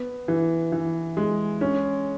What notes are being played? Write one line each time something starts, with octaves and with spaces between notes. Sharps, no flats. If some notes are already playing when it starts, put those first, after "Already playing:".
Already playing: B3
E3
E3
G#3
C#4